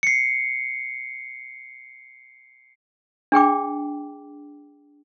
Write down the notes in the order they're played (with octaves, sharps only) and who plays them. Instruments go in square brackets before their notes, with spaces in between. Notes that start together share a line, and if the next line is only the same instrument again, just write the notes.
[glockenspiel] C7 C#7
[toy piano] D4 G#4 G5 D6